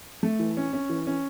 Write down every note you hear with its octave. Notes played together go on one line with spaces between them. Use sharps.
A3
E3
C#4
C#4
E3
C#4